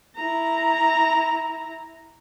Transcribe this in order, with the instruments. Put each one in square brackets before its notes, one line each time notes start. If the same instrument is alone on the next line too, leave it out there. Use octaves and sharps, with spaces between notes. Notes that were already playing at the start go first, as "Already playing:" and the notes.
[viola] E4 A#5